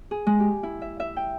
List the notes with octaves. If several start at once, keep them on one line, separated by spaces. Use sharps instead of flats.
G#4
G#3
G4
E4
E5
E5
G5